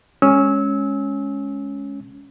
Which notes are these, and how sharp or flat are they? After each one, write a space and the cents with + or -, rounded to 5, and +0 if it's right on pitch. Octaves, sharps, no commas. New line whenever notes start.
G#3 +0 C#4 +0 E6 -25